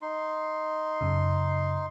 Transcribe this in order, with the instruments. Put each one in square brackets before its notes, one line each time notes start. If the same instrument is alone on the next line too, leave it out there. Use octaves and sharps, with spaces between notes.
[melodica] D#4 C6
[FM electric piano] F#2 C#3